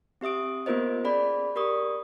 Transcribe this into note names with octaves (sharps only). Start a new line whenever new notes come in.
C4 G4 E5 D#6 D7
A#3 B3 F4 A#4 C5 D#5
C#4 G#4 D5 B5
G4 A#4 D5 C#6 D#6